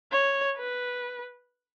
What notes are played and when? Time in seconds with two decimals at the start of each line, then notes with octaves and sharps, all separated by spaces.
0.12 C#5
0.57 B4